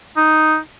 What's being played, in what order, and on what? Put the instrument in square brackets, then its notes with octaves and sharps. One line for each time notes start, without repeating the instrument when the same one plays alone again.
[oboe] D#4